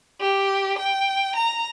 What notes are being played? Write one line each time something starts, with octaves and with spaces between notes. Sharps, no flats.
G4
G5
A#5